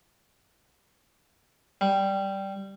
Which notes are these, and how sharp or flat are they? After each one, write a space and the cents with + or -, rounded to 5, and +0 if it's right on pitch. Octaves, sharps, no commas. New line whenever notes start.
G3 -5